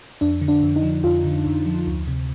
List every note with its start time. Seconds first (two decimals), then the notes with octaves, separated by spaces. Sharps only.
0.21 F2 D4
0.41 D3
0.48 D4
0.62 F2
0.76 D#4
0.83 F3
1.04 F2 F4
1.25 D3
1.46 F2
1.66 F3
1.87 D2
2.08 C3